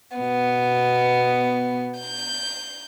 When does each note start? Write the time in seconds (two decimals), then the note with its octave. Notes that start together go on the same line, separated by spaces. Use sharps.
0.18 B2 B3
1.99 G6